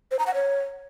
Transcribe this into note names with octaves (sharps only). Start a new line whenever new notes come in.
C5
A#5
F#5
C#5